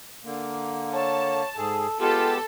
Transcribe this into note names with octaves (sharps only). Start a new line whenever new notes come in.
D3 A#3
C#5 A5
G#2 G#4 A4
G#3 B3 F4 G4 A4 A5